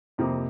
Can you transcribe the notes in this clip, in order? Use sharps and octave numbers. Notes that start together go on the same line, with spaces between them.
F2 C3 F3 A#3